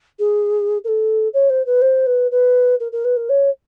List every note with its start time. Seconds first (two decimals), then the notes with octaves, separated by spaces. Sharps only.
0.19 G#4
0.84 A#4
0.88 A4
1.34 C#5
1.50 C5
1.66 B4
1.82 C5
2.06 B4
2.31 B4
2.80 A#4
2.92 A#4
3.04 B4
3.17 A#4
3.29 C#5